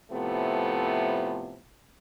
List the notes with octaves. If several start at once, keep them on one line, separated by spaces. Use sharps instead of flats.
A2 C3 F3 A3 B3